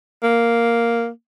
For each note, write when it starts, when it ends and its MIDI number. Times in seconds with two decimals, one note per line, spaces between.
0.23 1.09 58